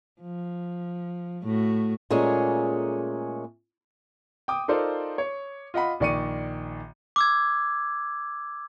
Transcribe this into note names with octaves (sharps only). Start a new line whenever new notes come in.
F3
A2 A3 F#4
A#2 G#3 A3 C#4 G#4
G5 D6 D#6
D#4 F4 A4 A#4 C5 D5
C#5
F4 D#5 F#5 B5
A#1 D#3 D5 C#6 C#7 D#7
D6 E6 G#6